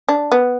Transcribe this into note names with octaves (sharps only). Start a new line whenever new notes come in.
D4
B3